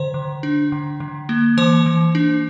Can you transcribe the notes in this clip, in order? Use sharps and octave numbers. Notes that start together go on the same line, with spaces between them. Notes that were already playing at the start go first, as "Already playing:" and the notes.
Already playing: D3 C5
D3
D4
D3
D3
A#3
E3 C5
E3
D4